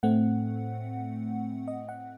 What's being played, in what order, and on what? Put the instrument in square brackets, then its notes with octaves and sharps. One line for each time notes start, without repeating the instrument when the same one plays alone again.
[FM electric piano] A2 A3 C4 F#5
D#5
F#5